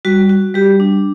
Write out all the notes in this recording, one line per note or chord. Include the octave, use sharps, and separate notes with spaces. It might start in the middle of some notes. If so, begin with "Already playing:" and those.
G3 F#4
F#4
G3 G4
D4